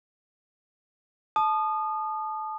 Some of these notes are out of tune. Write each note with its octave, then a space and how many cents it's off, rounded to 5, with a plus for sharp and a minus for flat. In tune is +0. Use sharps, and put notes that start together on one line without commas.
A5 -20 D#6 -30